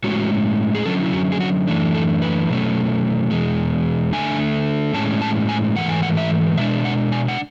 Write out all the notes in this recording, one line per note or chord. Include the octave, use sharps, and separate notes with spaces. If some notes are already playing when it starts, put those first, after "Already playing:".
A2 G#3 C#4 F#4
G#4
D3 F#3 C#4 A4
E4
F#4
G#4
F#4
F#2 E3 A3 D4
A4
B4
B2 F#3 A3 C#4
E2 B2 G#3
D3 A3 D4 G#5
A2 G#3 C#4 A5
A5
G#5
G#2 E3 A3 F#5
G#5
F#5
E5
B2 G#3 D4 E5
F#5
G#5
F#5